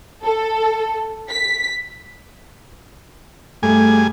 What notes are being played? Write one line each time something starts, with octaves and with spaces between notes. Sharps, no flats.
A4
B6
G2 A3 G#4 G#5